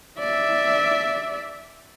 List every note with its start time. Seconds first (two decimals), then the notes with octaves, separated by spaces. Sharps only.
0.19 D5 E5